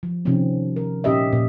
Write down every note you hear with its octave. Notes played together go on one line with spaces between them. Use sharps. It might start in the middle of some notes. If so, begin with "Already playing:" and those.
F3
C3 D#3 F3 C4 C#4
A#4
A#2 C#4 G4 D#5 E5
A#2